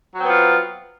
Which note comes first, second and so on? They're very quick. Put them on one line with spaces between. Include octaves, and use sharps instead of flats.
F#3 C4 B3 F4